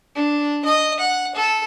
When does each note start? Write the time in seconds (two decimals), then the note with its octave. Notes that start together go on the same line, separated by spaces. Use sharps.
0.15 D4
0.65 D#5
0.99 F#5
1.35 A4